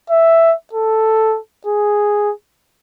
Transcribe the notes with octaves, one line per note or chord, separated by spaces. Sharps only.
E5
A4
G#4